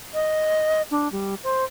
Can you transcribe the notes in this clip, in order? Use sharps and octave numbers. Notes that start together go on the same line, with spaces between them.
D#5
D4
G3
C5